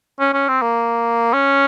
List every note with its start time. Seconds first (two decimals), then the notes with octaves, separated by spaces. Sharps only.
0.20 C#4
0.33 C#4
0.48 C4
0.62 A#3
1.33 C#4